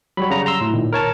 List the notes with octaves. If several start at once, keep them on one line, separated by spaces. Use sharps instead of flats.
F#3 G3 C#5 B5
C#3 A#5
A#5 C6 E6
A2
A#2 D#3
A#4 C#5 A5